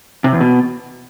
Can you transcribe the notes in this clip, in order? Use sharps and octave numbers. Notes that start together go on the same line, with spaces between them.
C3
E2
B2